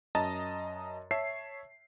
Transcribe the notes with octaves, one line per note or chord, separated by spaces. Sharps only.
F#2 D#5 A5 A#5 A6
C#5 E5 A5 C7